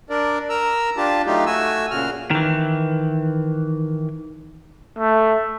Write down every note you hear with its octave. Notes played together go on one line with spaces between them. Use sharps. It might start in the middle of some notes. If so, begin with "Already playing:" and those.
D4 A#4 D5
A#4 A#5 E6
D4 F4 G4 A5
F#3 A3 D#4 F4 G4
A3 F#4 G#5 E6
A#2 C#3 F#4 F6
D#3 E3
A3